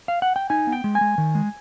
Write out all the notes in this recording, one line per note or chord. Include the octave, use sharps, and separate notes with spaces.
F5
F#5
G5
D#4 G#5
B3
G5
G#3
G#5
G#3
D#3
G#3